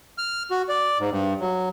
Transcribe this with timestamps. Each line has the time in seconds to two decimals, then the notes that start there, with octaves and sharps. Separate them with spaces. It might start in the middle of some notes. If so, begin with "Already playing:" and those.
0.18 F6
0.51 F#4
0.69 D5
1.00 G#2
1.11 G2
1.40 F#3